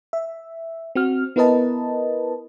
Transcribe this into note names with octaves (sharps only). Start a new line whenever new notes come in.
E5
C4 F#4 F6
B3 E4 A#4 B4 D#5 A5